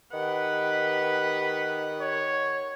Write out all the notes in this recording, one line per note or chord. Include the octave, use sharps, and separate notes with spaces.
D#3 G4 B4 F#5
C#5